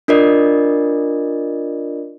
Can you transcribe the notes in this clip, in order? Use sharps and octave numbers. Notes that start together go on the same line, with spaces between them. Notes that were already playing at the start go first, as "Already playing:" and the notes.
D4 F4 A#4 D5 D#5